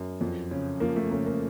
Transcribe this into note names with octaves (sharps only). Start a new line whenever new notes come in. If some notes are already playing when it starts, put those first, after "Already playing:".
Already playing: F#2
F2
C#3
F3 A#3
A3
C#3 A#3
A#3